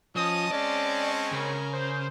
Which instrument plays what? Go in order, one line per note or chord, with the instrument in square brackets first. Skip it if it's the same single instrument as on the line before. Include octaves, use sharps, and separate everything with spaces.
[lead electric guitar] F3 [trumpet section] C#4 D#6 [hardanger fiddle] D#5 A5
[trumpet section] G#3 C4 C#4 [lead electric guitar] D5
[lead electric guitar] C#3 [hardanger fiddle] A#4 G#5
[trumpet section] C5